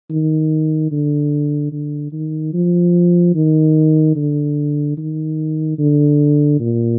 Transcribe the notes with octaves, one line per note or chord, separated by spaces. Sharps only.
D#3
D3
D3
D#3
F3
D#3
D3
D#3
D3
A#2